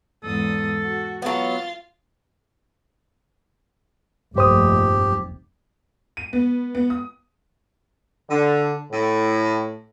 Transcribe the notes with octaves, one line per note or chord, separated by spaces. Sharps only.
E2 G#2 A4 D#6
F#4
F#3 B3 F4 A6
F1 A#1 G2 G4 C5 D#6
D#7
B3
B3
D#6
D3
A2